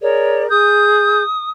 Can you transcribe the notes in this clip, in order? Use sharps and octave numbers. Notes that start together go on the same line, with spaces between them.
G#4 A#4 C#5 D5
G#4 D#6 G6